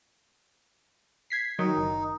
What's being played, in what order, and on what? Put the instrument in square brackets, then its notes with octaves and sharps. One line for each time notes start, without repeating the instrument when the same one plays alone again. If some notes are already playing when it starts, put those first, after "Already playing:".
[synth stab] G#6 B6 C7
[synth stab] D#3 [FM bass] F#3 [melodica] D#4
[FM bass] F#1